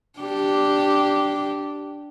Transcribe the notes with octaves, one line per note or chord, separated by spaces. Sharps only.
D4 G4